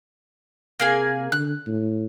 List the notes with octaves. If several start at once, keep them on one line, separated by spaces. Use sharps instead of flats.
C3 A#3 G#4 G#5
D3 F#6
A2